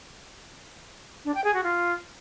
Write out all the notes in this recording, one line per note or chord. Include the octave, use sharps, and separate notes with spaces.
D4
G5
G#4
F#4
F4